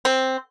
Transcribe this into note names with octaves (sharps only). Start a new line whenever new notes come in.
C4